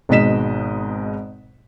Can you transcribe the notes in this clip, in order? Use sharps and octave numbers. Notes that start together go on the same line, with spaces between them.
G#1 G#2 B2 D#5 B6 E7